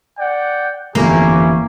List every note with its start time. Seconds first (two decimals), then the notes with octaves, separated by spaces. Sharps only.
0.18 D5 F#5 G5
0.95 G1 F2 E3 A#3 C#4 E4 G4 A#5